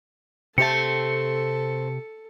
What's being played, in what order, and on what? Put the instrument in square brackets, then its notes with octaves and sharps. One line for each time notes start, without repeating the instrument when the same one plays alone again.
[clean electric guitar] C3 G4 A5 [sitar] A3 C4 [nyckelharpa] A4 [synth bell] C#7